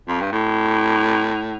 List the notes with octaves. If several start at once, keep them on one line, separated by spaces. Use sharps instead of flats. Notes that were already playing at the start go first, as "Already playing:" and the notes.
F2
G2
A2